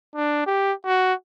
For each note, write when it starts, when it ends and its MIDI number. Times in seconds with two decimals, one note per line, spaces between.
0.15 0.44 62
0.46 0.73 67
0.86 1.13 66